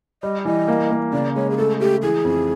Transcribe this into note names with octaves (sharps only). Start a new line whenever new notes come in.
G3 D#5
E3 D#5
A#3
A#3
C#3 D5
G#3 C#5
G#4
A3 A4
A3 G4
E3 G#4
F2